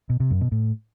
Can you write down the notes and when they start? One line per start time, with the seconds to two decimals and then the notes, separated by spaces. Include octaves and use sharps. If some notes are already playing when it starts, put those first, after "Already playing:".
0.10 B2
0.20 C3
0.31 F#2
0.41 B2
0.52 A2